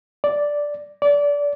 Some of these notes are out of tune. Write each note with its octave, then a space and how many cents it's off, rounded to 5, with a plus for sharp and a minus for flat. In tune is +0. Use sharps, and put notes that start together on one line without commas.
D5 -5
D5 -25